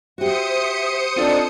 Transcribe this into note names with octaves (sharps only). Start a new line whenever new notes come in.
F#4 G4 C5 E5 D#6 C#7
C4 D4 D#4 F4 A4 D5